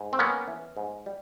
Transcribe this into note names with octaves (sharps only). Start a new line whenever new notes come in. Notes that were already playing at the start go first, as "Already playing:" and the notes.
Already playing: G#2
C4
A#3 B3 C#4
E3
G#2
G3